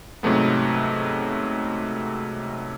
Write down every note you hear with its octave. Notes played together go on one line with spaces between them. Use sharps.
G#2 C3 F#3 A3 B3